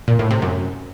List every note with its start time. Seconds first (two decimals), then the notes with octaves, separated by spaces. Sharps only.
0.08 A#2
0.19 A2
0.31 C3
0.42 F#2